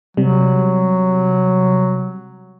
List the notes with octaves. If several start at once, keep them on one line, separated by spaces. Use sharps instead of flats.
C3 F#3 G3